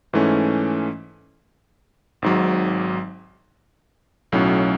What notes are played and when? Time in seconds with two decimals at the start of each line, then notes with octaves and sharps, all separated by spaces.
0.13 G#2 E3 A3 C#4
2.22 G#1 G#2 F#3
4.32 B1 A2 F#3 C#4